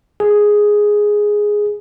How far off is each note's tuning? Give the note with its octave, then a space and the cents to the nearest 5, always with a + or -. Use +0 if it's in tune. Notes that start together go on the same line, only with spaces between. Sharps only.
G#4 +0